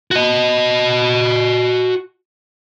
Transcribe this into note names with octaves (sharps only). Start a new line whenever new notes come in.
F#4 D#5